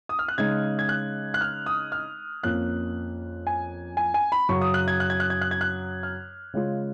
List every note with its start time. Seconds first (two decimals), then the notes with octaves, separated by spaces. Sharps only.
0.09 D#6
0.19 F6
0.28 F#6
0.38 C#3 G#3 D#4 G#6
0.79 G#6
0.89 F#6
1.34 F#6
1.41 F6
1.66 D#6
1.92 F6
2.43 F2 F3 A#3 C#4 F#6
3.47 G#5
3.97 G#5
4.14 G#5
4.32 B5
4.49 F#2 C#3 F#3 C#6
4.62 D#6
4.74 F#6
4.88 G#6
5.00 F#6
5.10 G#6
5.20 F#6
5.30 G#6
5.41 F#6
5.51 G#6
5.61 F#6
6.03 F6
6.54 C#3 G#3 C#4 F4